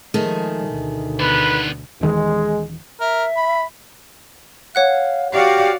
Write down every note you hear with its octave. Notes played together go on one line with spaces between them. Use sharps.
D#3 F3 G#3 A3 G#4
D2 B2
D3 B3 B4
D#1 D#3 E3 G#3
A#4 E5
B5
C#5 F5 F#5 F#6
F#4 G4 D5 F5